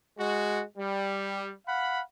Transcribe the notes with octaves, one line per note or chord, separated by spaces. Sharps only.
G#3 F#4
G3
F5 F#5 B5